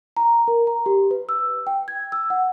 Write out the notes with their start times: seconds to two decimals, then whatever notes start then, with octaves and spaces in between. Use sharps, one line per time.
0.17 A#5
0.48 A#4
0.67 A#5
0.86 G4
1.11 B4
1.29 E6
1.67 G5
1.88 G#6
2.12 E6
2.30 F#5